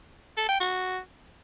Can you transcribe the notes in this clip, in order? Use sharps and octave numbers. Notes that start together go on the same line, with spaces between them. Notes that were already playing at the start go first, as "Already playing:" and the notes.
A4
G5
F#4